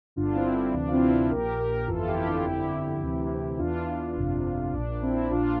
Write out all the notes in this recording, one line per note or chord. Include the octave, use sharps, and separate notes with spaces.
G1 G2 D3 D4 F4
C4 E4
C4
D2 C3 E3 D4
F4
C4 E4
C4 E4
A#1 A#2 G4 A#4
G4 A#4
G1 F2 E3 F4 A4
E4 G4
D4 F4
G1 F2 D3 E4 G4
D2 C3 E3
E2 E3 D4 F4
G1 F2 C3
A#1 A#2 D4
C4 E4
A#1 A#2 D4 F4